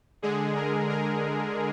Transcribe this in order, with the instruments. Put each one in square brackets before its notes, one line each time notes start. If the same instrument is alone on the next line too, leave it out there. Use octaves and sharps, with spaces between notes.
[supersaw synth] D3 G#3 G#4
A#4
A#4